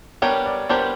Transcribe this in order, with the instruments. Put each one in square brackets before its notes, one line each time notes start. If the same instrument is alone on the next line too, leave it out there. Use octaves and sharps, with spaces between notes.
[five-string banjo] G3 B3 D4 G4 A#4 [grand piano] C#5
[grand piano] D5
[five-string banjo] G3 B3 D4 G4 A#4 [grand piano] C5